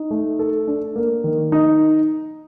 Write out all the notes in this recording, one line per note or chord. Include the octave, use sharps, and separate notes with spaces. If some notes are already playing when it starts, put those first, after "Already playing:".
Already playing: D#4
A3
A4
D4
A#3
D#3
D#4